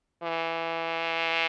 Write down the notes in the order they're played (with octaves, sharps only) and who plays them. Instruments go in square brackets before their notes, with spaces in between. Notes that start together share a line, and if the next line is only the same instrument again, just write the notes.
[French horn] E3